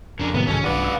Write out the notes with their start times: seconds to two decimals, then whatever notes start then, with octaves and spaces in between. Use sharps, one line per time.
0.19 F2 C#3 D4 A#4
0.34 A2 C3 D#3 F#3 B3
0.47 C2 G#2 C#3 C#4 A4 G#5
0.64 B1 G2 C#3 B4 D5 F#5
0.84 F5 E6